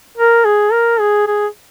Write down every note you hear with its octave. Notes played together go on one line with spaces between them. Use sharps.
A#4
G#4
A#4
G#4
G#4